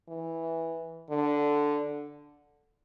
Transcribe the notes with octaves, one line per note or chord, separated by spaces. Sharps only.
E3
D3